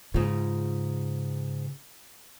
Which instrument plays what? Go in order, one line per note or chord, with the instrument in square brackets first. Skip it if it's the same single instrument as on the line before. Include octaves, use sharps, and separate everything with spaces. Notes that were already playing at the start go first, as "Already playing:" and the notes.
[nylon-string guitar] G#2 F4 [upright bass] C#3